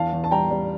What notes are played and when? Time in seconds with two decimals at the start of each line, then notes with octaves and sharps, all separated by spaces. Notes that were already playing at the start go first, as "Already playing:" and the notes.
Already playing: E2 F5 A5
0.13 E2
0.24 A5
0.31 G3 G5 A#5
0.50 G3